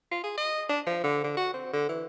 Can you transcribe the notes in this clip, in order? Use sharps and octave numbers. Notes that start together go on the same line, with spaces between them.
F4
G#4
D#5
D4
F3
D3
D3
F#4
C4
D3
E3